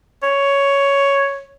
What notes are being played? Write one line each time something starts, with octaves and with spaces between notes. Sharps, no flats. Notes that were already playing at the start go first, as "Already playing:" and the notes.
C#5